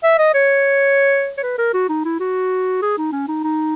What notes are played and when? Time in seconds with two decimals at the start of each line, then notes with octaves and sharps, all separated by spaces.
0.04 E5
0.18 D#5
0.34 C#5
1.38 C#5
1.43 B4
1.58 A#4
1.74 F#4
1.89 D#4
2.05 E4
2.20 F#4
2.82 G#4
2.98 D#4
3.12 C#4
3.28 D#4
3.44 D#4